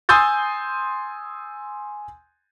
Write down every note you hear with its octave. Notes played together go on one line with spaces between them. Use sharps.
G#5 C6 D#6 E6 G6 A6